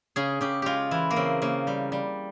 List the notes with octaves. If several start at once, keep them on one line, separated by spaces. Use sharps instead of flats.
C#3 G#4
C#3 G4
G#3 F4 G4
E3 E4
A#3
C#3 C4
C#3 A#3
G3
G3